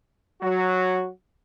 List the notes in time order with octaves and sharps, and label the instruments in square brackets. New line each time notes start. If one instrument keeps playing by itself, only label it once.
[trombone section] F#3 F#4